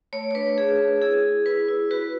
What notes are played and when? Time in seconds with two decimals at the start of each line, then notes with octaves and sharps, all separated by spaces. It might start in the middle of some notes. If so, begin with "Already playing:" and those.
0.13 A3 C#5
0.31 C#5
0.35 D4 B4
0.57 A3 G#4
0.79 A3
1.02 E4 G#4
1.24 E4
1.46 E4 B4
1.68 E4
1.91 F#4 B4